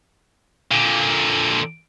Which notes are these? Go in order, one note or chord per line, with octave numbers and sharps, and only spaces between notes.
A#2 D3